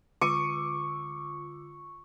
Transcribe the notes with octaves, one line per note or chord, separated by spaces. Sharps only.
D3 F4 C#6 D6 E6 C#7 D#7